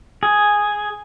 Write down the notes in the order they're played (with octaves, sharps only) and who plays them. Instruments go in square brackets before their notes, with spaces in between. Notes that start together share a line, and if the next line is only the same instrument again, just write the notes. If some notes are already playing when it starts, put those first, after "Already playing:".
[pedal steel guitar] G#4